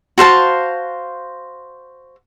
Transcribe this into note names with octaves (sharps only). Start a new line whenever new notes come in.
F#4 C5 F5 A5